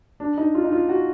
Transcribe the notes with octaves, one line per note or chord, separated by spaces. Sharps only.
D4
D#4
F4
D#4
F4
F#4